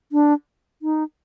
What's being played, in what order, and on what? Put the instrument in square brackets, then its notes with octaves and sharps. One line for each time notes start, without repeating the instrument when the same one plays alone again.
[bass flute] D4
D#4